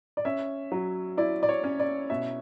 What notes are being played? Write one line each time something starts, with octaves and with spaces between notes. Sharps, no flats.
D5
C#4 E5
F#3
E4 D5
D5
C#5
C#4
D5
B2 E5